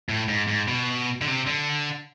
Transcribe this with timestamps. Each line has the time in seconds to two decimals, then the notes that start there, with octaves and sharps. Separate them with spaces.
0.09 A2
0.29 G#2
0.48 G#2
0.68 B2
1.21 D3
1.28 C3
1.47 D3